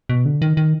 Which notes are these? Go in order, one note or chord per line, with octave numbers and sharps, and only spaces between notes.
B2
D3
D#3
D#3